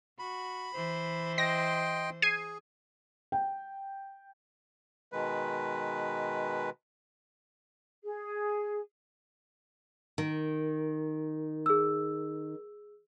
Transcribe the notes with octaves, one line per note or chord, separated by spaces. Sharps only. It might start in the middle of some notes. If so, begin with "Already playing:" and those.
F#4 B5
E3 C5
D#5 G5 C6 A#6
G#4 G#6 C7 D#7
G5
B2 D#3 G#3 B4
G#4
D#3
G#4 E6